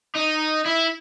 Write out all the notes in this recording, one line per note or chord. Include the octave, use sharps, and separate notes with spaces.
D#4
E4